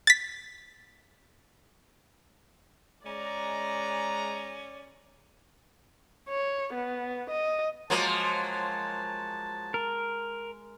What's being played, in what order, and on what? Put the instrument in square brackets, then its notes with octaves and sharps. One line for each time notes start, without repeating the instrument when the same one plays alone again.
[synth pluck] A6 B6
[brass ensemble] G#3 A#5 [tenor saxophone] C#4 [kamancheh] D5
[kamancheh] C#5
B3
D#5
[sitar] F3 F#3 A#3 [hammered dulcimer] G#3 [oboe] A5
[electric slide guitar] A#4